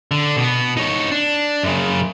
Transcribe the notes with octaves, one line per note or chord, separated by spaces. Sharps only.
D3
B2 B3
D#4 C#5
D4
F#2 C#3